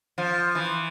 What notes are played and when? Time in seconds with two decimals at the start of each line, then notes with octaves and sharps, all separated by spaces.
0.18 F3
0.55 E3